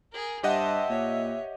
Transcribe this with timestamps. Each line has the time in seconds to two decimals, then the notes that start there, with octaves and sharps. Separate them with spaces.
0.12 G#4 A#4
0.44 G2 G4 C5 D#5 E5 F#5 A5
0.90 A#2 C#5